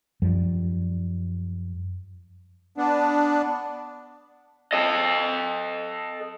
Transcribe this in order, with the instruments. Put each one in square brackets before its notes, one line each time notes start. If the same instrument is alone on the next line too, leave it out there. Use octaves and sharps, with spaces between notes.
[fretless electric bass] F#2 F3 G3
[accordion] B3 D4
[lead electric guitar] A4 D#5